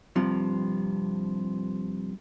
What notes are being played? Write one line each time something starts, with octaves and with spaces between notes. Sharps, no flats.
G2 C3 F3